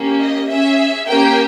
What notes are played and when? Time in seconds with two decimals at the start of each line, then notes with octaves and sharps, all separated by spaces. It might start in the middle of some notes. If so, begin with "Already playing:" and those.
Already playing: A#3 C#4 G4
0.20 D#5
0.48 C#4 G#4 E5
1.07 A#3 C#4 G4 G5